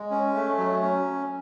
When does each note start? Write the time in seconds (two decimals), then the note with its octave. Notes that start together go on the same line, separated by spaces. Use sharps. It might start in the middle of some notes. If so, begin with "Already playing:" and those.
Already playing: G#3
0.11 C#4
0.34 A3
0.58 F#3
0.81 C#4